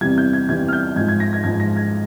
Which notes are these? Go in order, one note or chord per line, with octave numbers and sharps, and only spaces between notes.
E2 C3 E3 G3 G#6
G6
G#6
E2 C3 E3 G3 G#6
F6
G6
G#2 F3 G#3 G#6
G#6
A#6
G#6
G#2 F3 G#3 G#6
A#6
G#6